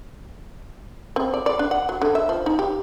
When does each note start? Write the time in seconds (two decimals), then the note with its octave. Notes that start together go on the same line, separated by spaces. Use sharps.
1.16 C4
1.34 D5
1.46 D5
1.59 D4
1.71 F#5
1.89 F#3
2.02 D3
2.15 E5
2.29 F3
2.46 D#4
2.59 G4